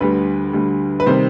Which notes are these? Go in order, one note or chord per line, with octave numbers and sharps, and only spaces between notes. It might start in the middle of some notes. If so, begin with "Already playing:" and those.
D2 D3 G3 B4
D2 D3 G3
B4
C3 D#3 G3 C5